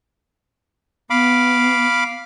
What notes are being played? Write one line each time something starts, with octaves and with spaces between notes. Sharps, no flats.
B3 F5 B5 D6